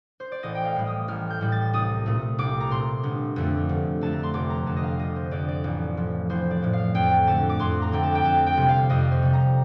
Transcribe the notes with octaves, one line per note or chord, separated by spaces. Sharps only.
C5
D5
A1 D#5
G5
F5
A2 G3
D#6
A1 F6
G6
A2 G3
A6
C2 D#6
A#2 A3
C2 D6
A#5
A#2 A3 C6
G1
F2 D3 A3
G1
F2 D3 A3 A5
A#5
C6
F1 D6
A#5
F2 D3 A5
D#5
F5
F1 D#5
C5
F2 D3 D5
D5
A1
A2 F3
A1 C5
D5
A2 F3
F5
F2 G5
D3 A3 A5
D6
F2 C6
A#5
D3 A3 G5
A5
G5
F2 A5
G5
C3 G3
F5
F2 D#5
C5
C3 G3
A#5